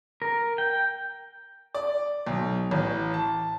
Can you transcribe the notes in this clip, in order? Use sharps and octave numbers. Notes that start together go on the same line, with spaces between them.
A#4
G5
D5
B1
A1
A5